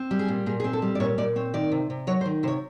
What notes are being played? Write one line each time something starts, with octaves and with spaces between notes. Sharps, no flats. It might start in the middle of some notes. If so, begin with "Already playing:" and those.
Already playing: C4
G3
G#4
A#2
A#2 G#4
G#4
C4
A4
G3
D5
A#2 C#5
A#2 D5
C4 C#5
D#3 D5
C3
C3
F#3 C#5
C5
D#3
C3 C5 C#5